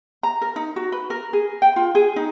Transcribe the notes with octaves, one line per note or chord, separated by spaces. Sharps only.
A#5
A#4
D#4
F#4
B4
A#4
G#4
G5
F4
G#4
D#4